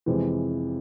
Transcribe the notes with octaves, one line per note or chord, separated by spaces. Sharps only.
F2 C3 E3 G#3